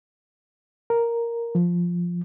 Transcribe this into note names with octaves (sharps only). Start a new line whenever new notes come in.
A#4
F3